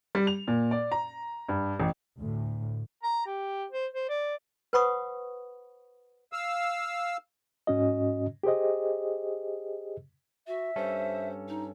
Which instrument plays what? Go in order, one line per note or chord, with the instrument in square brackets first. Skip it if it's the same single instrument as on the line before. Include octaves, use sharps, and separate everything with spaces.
[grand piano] G3
F7
A#2
D5
A#5
G2
A1
[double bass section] D2 A2
[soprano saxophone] A#5
G4
C5
C5
D5
[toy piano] B4 C5 F#5 B5 C#6 D#6
[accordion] F5 E6
[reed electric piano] G#2 C#4 F#4 D#5
G4 G#4 C5 D#5
[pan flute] F#4 [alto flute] E5
[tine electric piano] G2 C#4 A4 [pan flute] C5
[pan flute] D#4